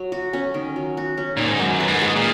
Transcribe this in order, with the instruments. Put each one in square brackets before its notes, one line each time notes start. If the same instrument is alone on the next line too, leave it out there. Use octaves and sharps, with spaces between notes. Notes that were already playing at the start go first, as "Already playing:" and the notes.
Already playing: [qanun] F#3
F#4
C#4
D#3
F#3
F#4
C#4
[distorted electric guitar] A#2 [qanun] D#3
[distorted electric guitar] G#2
[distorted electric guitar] F#2 [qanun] D#4
[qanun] B4
[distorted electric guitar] G#2
[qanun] G#4
[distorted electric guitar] A#2